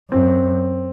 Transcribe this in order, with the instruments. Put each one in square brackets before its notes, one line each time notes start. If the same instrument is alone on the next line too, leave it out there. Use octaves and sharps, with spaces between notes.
[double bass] F#2 [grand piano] C4